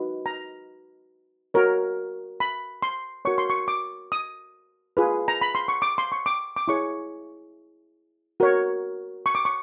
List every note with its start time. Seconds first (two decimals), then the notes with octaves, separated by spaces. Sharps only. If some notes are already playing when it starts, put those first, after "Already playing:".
Already playing: D#4 F#4 B4
0.26 A#5
1.54 F#4 A#4 C#5
2.40 B5
2.82 C6
3.25 F#4 A#4 C#5 C#6
3.38 C6
3.50 C#6
3.68 D6
4.12 D#6
4.97 F4 G#4 B4
5.28 A#5
5.41 B5
5.55 C6
5.68 C#6
5.82 D6
5.98 C6
6.12 C#6
6.26 D6
6.56 D6
6.68 E4 G#4 C#5 C#6
8.40 F#4 A#4 C#5
9.26 C#6
9.35 D6
9.45 C#6